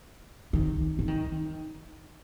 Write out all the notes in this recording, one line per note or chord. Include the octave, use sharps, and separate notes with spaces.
D#3
E3
D#3